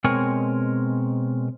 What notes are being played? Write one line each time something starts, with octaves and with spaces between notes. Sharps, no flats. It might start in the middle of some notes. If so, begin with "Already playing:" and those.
B2 G#3 C4 A#4 C#5 G#5